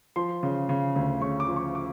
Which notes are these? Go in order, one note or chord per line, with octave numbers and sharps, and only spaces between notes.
F3 C6
C#3
C#3
D2
C#3 C#6
D6
F3
C#6
D6